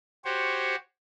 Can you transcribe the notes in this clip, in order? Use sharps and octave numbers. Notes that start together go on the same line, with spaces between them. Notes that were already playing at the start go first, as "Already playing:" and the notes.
F#4 G4 C5 C#5